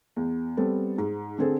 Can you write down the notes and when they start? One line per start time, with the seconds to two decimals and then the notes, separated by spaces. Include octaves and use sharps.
0.16 E2
0.57 G3 B3 C4 A4
0.98 G#2
1.38 D3 C4 G#4 A4